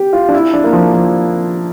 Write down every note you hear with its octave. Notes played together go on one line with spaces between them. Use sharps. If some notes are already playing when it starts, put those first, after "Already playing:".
Already playing: G4
F4
D4
E4
D4
A#3
F3
F3